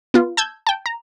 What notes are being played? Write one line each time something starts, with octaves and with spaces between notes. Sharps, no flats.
B3 F4
A5 E6 G6 G#6
G5 A5
A#5